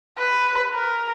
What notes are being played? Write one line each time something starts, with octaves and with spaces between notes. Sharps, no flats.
B4
A#4